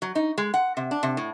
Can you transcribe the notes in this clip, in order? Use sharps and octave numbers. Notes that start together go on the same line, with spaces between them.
F#3
D#4
G#3
F#5
C3
D4
C3
A2